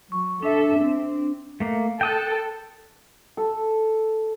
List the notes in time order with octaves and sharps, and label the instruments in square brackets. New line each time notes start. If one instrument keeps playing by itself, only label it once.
[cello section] F#3 [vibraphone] C#6
[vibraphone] D4 [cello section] A4 E5
[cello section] C4
[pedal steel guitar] A3 A#3
[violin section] A4 A5 [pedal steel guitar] G5 D#6 F#6
[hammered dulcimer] A4